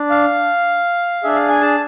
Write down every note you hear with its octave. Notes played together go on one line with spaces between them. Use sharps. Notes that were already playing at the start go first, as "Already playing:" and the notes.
Already playing: D4
F5
D4 G#4 E5
F5
G#5
A5